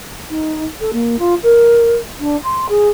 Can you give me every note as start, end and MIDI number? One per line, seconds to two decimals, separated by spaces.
0.30 0.64 63
0.81 0.91 69
0.93 1.16 58
1.19 1.35 65
1.43 1.95 70
2.20 2.36 62
2.44 2.67 84
2.69 2.89 68